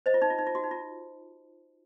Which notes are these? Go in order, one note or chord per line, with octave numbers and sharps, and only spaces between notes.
C5 D#5
F4
D#4
F4
D#4
F4
F#4
D#4
F4